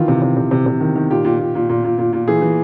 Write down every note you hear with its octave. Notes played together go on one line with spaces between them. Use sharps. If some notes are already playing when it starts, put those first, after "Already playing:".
Already playing: D#3 E3 F4
C3
C3
C3
C3
C3
D#3
D#3
A#2 G4
A#2
A#2
A#2
A#2
A#2
A#2
A#2
E3 G#4
E3